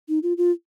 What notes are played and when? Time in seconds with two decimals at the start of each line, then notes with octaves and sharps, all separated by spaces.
0.09 D#4
0.23 F4
0.38 F4